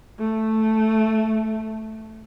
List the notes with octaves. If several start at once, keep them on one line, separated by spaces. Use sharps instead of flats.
A3